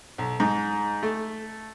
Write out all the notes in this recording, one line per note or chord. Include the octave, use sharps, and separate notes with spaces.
B1
G#2
A3